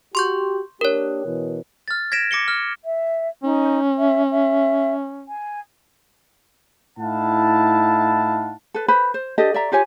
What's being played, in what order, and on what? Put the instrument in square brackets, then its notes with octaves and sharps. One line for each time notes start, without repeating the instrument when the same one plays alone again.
[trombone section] F#4 G4 [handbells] C6 C#6 G6
[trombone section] A#3 D4 G4 [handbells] A#4 C#5
[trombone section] B2 E3
[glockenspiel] F6 A6
G#6 A#6 B6 D7 E7
D6 A#6 C#7 G7
F6
[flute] E5
[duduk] C#4 [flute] D#4
[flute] E5
E5
G#5
[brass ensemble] A2 D#4 E4 F5 F#5 A5
[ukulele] A4 B4
B4 C5 B5
C5
D4 G4 A4 D#5
D5 E5 A#5
F4 G4 C#5 G#5